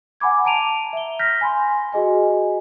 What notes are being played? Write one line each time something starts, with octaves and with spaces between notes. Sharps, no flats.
F#5 G#5 B5 D6 G#6
A5 A#5 D7 D#7 F7
E5 G7
F6 G6 A#6 B6
G#5 B5 C6
F#4 G#4 D#5 G#5